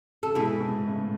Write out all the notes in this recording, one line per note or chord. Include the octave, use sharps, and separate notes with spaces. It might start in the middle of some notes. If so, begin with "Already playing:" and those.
C#3 A4
G#2 B2 E4 G#4
G#2 B2
A2 C#3